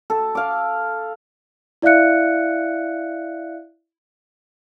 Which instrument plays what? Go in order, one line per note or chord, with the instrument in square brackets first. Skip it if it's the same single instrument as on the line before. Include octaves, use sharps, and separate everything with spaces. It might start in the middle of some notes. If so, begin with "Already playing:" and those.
[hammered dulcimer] A4
F5 D6
[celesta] E4 D5 E5 F5 F#6 C#7